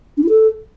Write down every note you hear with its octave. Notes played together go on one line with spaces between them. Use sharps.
D4
E4
A4